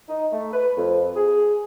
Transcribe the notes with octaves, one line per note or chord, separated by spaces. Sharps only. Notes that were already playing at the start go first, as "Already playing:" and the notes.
D#4
A3
B4
F2
G#4